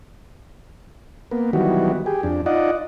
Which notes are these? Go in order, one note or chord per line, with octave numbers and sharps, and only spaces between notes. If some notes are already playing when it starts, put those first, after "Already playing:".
A#3 B3
D#3 E3 F#3 G3 B3 F#4
G4 G#4
F2 D4
D#4 F4 D5 D#5 F#5